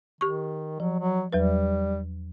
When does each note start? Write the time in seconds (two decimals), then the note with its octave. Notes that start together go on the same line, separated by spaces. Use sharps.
0.21 D#3 G4 C#6
0.80 F3 F#3
0.99 F#3
1.33 E2 F#3 G3 B4